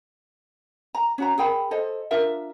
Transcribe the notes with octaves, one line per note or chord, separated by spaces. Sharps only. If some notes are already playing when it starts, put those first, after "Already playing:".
A#5
C#4 F#4 A#5
G#4 A#4 G5 B5
A4 C5 D#5
D4 F4 A#4 E5